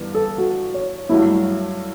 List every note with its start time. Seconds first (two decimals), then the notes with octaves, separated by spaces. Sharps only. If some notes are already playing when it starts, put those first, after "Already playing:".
Already playing: G1 G2 E3 B3
0.15 A4
0.38 F#4
0.74 C#5
1.09 G2 F#3 A3 E4